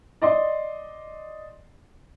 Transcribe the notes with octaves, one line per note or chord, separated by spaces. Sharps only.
D5 D#5 C6